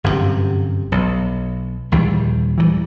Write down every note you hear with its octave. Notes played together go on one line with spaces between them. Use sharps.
G1 F#2 A2 C3
B1
A#1 D#2 E3 G3
E3 F3 G3